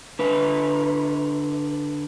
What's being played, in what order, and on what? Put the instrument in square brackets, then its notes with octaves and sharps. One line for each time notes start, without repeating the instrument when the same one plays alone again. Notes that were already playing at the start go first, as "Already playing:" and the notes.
[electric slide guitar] D3 B4